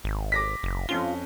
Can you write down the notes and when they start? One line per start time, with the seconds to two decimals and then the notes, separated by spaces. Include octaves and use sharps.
0.04 G#1
0.32 D6 A#6 B6
0.63 F#1
0.89 F2 C#4 F4 G7